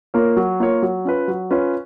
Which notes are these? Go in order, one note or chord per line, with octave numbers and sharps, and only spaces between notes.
A#3 F4 A#4 C#5
F#3
A#3 F4 A#4 C#5
F#3
C#4 F4 B4
F#3
C#4 F4 B4